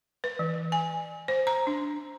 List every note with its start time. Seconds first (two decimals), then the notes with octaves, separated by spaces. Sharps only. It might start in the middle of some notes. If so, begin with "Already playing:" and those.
0.24 B4
0.39 E3
0.72 G#5
1.28 C5
1.47 A#5
1.67 D4